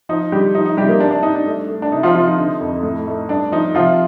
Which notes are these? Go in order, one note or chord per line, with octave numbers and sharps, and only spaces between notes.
F3 D#4
D3 G3 G4
F3 D#4
D#4
C3 G3 G4
A#3 A#4
G2 D4
D4
G2 D#4
D4
A3
A3
D4
C3 D#4
F3 F4
C3 F3 F4
D#4
D3
F2
A2
A3
G2 D4
F3 D#4
C3 F3 F4